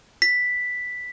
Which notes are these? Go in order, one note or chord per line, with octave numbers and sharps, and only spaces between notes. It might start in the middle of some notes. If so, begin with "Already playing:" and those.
B6